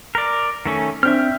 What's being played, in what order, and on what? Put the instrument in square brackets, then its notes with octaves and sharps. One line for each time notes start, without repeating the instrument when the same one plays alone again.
[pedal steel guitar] A#4 D5
D#3 A3 C#4
[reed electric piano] C4 D4 [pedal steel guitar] E5 G5 F6